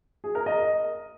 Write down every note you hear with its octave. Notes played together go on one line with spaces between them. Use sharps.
G#4
A#4
D#5